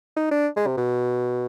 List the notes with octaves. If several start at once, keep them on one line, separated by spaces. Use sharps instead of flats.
D#4
D4
G#3
C3
B2